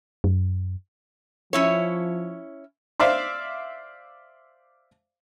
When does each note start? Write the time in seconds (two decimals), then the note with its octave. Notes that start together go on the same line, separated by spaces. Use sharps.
0.24 F#2
1.53 F3 C#4 E4 C#5
3.00 C5 D5 E5 F5